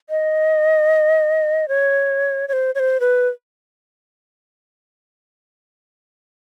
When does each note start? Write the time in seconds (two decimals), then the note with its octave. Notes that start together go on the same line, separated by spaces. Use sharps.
0.10 D#5
1.68 C#5
2.48 C#5
2.53 C5
2.75 C#5
2.79 C5
3.00 B4